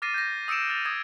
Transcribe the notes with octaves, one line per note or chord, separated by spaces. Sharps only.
D6 F6 A6 A#6 C7 D#7
G6 A#6
D#6 E6 C#7 D7 E7
F6 A6 D#7 F7
D#6 G#6 E7